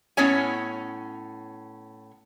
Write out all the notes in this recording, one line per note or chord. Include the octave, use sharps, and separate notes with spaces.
A2 B3 C#4 C#5 G#5